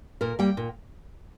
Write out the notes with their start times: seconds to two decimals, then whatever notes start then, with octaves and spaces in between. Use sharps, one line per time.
0.21 A#2 A#4
0.39 G3 A#3 G5
0.57 A#2